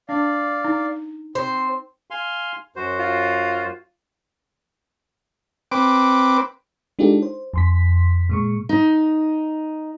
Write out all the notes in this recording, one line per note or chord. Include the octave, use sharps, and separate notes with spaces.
D4 D5 F5
D#4
C4 C5
F5 G#5 C6
F#2 F#4 C5
F4
C4 B4 D6
G#3 D4 D#4 F4 G4 A4
C5
F2 C6 B6
A#2 G#3 C#6
D#4